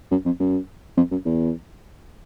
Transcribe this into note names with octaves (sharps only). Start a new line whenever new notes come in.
F#2
F2
F#2
F2
F#2
E2